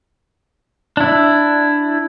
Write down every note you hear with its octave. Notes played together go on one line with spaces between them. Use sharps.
D4 E4